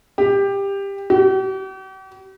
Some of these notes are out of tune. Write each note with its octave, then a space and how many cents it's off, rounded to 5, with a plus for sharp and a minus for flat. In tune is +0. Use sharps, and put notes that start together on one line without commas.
G4 +15
G4 -45